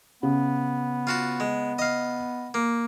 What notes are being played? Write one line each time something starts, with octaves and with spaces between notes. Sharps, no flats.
C#3 B3
F4 F#4 A5
G#3
D#5 F5
A#3